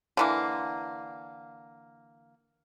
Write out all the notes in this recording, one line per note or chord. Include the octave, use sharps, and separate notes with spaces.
D3 E3 A#3